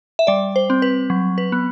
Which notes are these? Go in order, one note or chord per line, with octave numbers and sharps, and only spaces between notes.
E5
G3 D5
C5
C4
B4
F#3
B4
B3